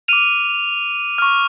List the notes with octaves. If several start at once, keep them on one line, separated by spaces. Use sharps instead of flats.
D6 F6 D#7 F7
C#6 F6